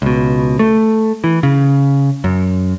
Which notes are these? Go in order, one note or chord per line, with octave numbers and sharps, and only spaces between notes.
C#2 B2
A3
E3
C#3
F#2